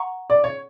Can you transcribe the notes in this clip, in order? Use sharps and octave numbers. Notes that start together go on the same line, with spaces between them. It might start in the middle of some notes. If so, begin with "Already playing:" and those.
Already playing: F#5 A#5 C#6
D5
C#5